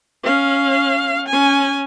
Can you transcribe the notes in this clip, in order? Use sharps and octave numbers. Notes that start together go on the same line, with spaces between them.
C#4 F5
C#4 G#5